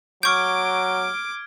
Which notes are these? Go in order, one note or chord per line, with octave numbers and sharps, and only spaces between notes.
F#3 C#6 D6 F6 G6 G#6 D7